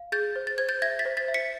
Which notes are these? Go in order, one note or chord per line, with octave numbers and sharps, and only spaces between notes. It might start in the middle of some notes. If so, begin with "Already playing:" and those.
Already playing: F5
G#4 G6 A6
C5
A6
C5 G#6
G6 A6
E5 G#6 A#6
A6 B6
C5
A6 B6
E5
B6 C#7